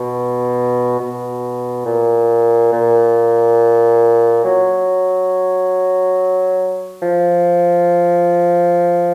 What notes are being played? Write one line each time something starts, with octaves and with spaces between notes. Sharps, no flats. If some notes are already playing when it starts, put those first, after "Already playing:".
Already playing: B2
B2
A#2
A#2
F#3
F3